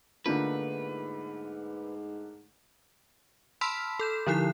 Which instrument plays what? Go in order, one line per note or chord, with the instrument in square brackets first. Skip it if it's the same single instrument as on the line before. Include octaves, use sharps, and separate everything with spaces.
[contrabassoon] G#2 [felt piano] D3 A3 A#3 [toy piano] D4 D#4 F4 [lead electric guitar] B4
[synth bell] A5 B5 C6 E6 F6 B6
A4 G6 E7
D3 F3 D#4 E4 F#6 C7